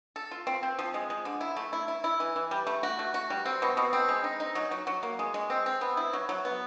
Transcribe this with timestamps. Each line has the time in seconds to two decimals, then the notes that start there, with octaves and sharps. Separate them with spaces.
0.16 A4
0.31 F4
0.47 C4
0.63 C4
0.79 F3
0.94 G#3
1.10 G#3
1.25 D3
1.41 E4
1.57 A3
1.73 E4
1.88 E4
2.04 E4
2.20 E3
2.36 E3
2.51 G3
2.67 A3
2.83 F#4
2.99 A3
3.14 F#4
3.30 G3
3.45 C4
3.62 B2
3.77 B2
3.93 C4
4.09 G#3
4.24 D#4
4.40 D#4
4.55 F#3
4.71 F#3
4.87 F#3
5.03 A#3
5.19 G#3
5.34 G#3
5.50 C4
5.66 C4
5.81 B3
5.97 E4
6.13 F#3
6.29 F#3
6.45 B3